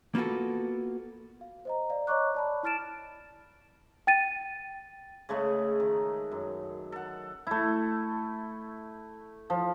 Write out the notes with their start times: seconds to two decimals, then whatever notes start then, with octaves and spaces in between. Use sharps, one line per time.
0.15 A#3 B3 F4 F#4 A4
1.41 F5
1.65 C5 D#5 A#5
1.90 D5 F5
2.07 C#5 D#5 A#5 C#6 D6 F#6
2.34 D5 A5 B5
2.63 E4 A5 F6 A6 D7 E7
4.07 G5 A6 D#7
5.29 C#3 G#3 A3 D#5
5.80 D#3
6.31 F#2
6.92 A4 F#5
7.47 A3 E4
9.50 F3